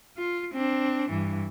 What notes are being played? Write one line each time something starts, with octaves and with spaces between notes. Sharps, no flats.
F4
C4 D4
G2 E3